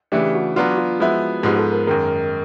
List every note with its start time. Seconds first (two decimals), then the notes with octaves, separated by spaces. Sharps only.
0.12 C#3 E3 A3 D4 G4
0.35 F#4
0.56 F#3 B3 D4 F4 F#4
0.71 F#4
0.78 F4
1.00 F3 G#3 B3 E4 F#4
1.43 G#2 F3 G#3 B3 G4
1.58 A4
1.72 A#4
1.87 F#2 D#3 G#3 A#4